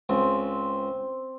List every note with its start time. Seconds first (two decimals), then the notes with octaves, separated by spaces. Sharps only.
0.09 C#2 C4